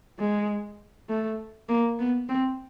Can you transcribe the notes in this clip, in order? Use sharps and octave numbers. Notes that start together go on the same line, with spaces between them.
G#3
A3
A#3
B3
C4